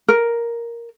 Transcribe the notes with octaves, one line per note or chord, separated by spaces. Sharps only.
A#4